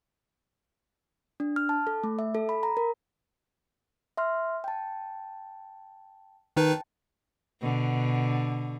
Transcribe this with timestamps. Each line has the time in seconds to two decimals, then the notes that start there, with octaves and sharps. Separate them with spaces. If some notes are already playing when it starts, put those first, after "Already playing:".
1.40 D4
1.56 F6
1.69 A5
1.87 A4
2.04 A3
2.19 E5
2.35 A4
2.49 B5
2.63 A#5
2.77 A#4
4.17 E5 C6 F6
4.64 G5 A5
6.57 D#3 D#4 B4 G5 A5
7.61 B2 D3